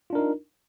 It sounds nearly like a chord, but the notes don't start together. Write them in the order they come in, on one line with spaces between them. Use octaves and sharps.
F4 D4 A#4 D#4